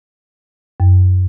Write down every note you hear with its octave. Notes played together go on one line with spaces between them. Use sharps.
F#2